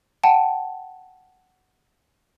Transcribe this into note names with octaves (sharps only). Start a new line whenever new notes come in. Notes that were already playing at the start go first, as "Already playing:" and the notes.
F#5 G5 A5